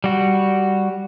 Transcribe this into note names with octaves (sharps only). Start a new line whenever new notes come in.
G3 F#4